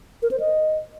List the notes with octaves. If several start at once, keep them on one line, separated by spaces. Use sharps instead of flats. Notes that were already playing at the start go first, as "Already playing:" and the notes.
A#4
C5
D#5